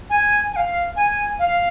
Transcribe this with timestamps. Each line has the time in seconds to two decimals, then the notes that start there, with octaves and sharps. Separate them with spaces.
0.10 G#5
0.53 G#5
0.56 F5
0.96 G#5
1.39 F5